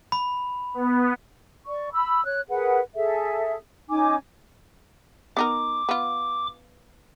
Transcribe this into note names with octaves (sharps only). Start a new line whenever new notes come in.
B5
B3
D5 C#6
B5 E6
C#5 F#6
G#4 A#4 B4 F#5
G#4 A4 E5
C#4 D#4 G#5 D6
B3 D#4 A#4 D6
B3 F4